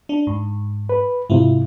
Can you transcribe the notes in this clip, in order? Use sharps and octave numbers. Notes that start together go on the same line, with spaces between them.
D4
G#2
B4
G#2 C3 E4 F4